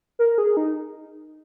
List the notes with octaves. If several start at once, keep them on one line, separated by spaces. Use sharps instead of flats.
A#4
G#4
D#4